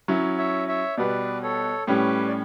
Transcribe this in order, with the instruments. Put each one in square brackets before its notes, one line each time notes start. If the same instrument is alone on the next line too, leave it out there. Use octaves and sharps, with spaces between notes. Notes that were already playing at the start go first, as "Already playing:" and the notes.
[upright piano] F#3 C#4 E4
[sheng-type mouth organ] C#5 E5
C#5 E5
[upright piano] B2 G3 B3 [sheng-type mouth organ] B4 D5
[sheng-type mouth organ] A4 C#5
[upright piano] A2 G3 C#4 [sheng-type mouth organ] G4 B4
[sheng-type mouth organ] D5